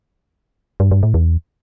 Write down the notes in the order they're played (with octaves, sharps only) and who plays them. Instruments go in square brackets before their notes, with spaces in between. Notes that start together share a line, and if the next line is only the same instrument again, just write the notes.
[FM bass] G2
G2
A2
E2